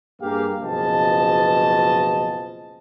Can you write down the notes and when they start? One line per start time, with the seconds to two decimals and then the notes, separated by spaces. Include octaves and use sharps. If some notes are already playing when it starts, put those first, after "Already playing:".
0.21 G2 A#3 G4 G#4 F5
0.61 F#1 B2 F3 G#4 D#5 A5